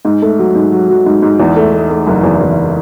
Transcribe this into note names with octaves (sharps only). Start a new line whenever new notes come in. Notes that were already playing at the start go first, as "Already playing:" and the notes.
G#2
A3
F#3
G#2
F#3
F#3
G#2
G#2
E2
A3
A3
A3
F#1
E2
E2